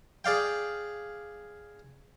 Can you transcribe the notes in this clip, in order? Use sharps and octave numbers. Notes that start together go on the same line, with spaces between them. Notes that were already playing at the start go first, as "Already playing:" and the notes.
G#4 D5 F5 G5